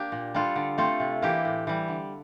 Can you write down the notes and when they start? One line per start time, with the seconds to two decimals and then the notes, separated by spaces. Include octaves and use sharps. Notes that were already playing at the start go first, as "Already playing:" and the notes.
Already playing: A#3 D4 G4
0.12 A#2
0.34 G3 D4 F4 A4
0.56 D3
0.78 A3 C4 F4 A4
1.00 C3
1.22 E3 A#3 E4 G4
1.45 A2
1.67 E3 G3
1.88 D3